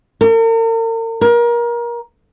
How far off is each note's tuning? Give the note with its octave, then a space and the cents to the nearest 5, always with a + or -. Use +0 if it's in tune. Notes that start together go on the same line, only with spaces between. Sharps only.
A#4 -45
A#4 +25